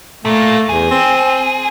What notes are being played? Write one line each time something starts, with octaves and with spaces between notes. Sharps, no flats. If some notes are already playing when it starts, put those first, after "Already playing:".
A#2 A3 A#3
E2 G#4
C4